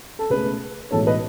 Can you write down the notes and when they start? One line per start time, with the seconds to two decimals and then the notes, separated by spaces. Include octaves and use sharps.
0.19 A4
0.30 C#2 B2 A3 G#4 B4
0.91 B1 A2 E3 G#3 A4 C#5
1.07 B4 D#5